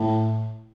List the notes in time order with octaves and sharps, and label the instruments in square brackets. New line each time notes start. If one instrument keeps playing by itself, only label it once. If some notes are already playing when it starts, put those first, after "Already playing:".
Already playing: [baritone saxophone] A2